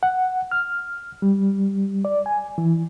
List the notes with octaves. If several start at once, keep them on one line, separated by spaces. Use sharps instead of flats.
F#5
F6
G3
D5
G#5
E3